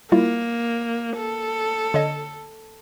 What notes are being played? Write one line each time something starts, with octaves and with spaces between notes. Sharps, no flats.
G3 A#3 E4 F4
A4
D3 C#5 D#5